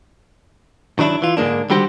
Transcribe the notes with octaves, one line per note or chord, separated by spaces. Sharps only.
D#3 F#3 D4 E4
E3 F4
G#2 D3 G#3 A#3 D4
D3 D#3 G3 F#4 G4 C5